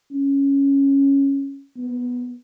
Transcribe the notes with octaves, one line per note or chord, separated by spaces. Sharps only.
C#4
B3